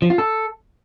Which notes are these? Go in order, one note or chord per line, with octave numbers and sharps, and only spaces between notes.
F3
F4
A4